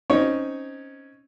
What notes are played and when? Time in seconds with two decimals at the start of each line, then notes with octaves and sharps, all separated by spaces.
0.10 C4 C#4 D#4 C#5